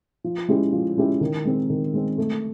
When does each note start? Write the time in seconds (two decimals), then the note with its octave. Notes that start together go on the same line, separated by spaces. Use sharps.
0.24 F3
0.49 G#3 C#4 E4 G4
0.73 F3
0.97 G#3 C#4 E4 G4
1.21 D#3
1.45 G#3 C4
1.70 D#3
1.94 G#3 C4
2.18 A3